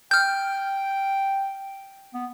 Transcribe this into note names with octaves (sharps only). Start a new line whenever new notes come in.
G5 F6 G6
B3